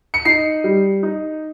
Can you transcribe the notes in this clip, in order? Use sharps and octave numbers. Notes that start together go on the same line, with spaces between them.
C#7
D#4 C7
G3
D#4